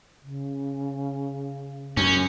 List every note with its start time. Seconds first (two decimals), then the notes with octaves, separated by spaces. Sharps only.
0.23 C#3
1.97 F#2 C#4